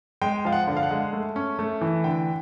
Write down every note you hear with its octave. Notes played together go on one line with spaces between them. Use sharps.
G#3 G5
F3 F5
F#5
D3
F5
F#5
G#3
A3
C#4
A3
E3
D3 G5